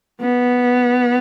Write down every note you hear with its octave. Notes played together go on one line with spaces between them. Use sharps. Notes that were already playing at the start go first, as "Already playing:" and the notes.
B3